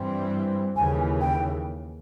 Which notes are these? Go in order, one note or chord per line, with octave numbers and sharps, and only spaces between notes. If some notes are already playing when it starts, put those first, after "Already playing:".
Already playing: G2 E3 G3 C4
D#2 C#3 E3 G#5
G5